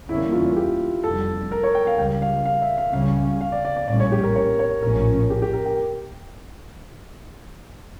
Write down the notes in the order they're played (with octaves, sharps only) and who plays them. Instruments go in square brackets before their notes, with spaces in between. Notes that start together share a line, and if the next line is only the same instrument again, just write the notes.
[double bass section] E2 D3 G3 A#3 C#4 [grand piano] E4
[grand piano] F4
G4
[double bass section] F1 F2 D3 G3 [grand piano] A4
[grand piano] A#4
C#5
G5
F5
[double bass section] C#2 C#3 G3 [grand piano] G5
[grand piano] F5
F5
E5
F5
[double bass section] C#2 C#3 G3 C#4 [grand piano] F5
[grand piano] F5
F5
D5
D5
D5
[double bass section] A#1 A2 G3 C#4 [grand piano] D5
[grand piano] C#5
G4
A#4
C#5
C#5
[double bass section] A#1 A2 F3 C#4 [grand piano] A#4
[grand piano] G4
G4
A#4
G5